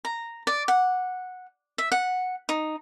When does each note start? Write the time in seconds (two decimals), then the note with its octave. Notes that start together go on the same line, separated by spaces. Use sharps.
0.05 A#5
0.47 D5
0.68 F#5
1.78 E5
1.92 F#5
2.49 D#4